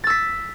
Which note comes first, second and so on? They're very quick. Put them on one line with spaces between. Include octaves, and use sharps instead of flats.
A6 E6 B6